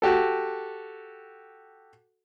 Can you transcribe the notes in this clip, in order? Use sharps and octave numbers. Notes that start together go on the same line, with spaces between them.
F#4 G4 A4